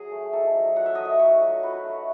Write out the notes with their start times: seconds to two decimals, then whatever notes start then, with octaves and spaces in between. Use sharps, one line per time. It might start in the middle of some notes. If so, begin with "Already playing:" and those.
Already playing: F#3 G#4
0.12 A3
0.33 D#4 A4
0.55 F#3
0.76 F#3 F#5
0.86 E5
0.95 A3 D#5
1.05 E5
1.19 D#4 C#5
1.41 F#3
1.63 F#3 B4
1.84 A3